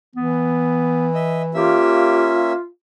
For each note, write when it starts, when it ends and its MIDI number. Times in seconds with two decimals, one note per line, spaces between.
0.16 1.82 52
0.16 1.09 59
1.14 1.42 75
1.14 1.42 76
1.54 2.52 58
1.54 2.52 61
1.54 2.66 65
1.54 2.32 67
1.54 2.52 76